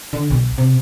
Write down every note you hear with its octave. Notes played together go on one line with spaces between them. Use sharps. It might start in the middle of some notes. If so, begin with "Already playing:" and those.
D3
B1
C3